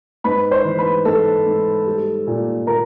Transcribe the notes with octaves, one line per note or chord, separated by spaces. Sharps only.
G#2 B4 B5
C5 C6
E3
B4 B5
G#2 A4 A5
G#2
G3
A#2
A#2 A#4 A#5